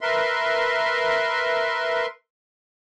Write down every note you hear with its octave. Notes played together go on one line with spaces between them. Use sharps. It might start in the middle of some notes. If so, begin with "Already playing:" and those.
A#4 B4 E5 C6